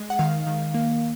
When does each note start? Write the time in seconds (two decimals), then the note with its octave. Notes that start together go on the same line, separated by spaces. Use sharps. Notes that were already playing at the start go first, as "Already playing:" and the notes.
Already playing: G#3
0.10 F#5
0.19 D#3 F5
0.47 D#3
0.74 A#3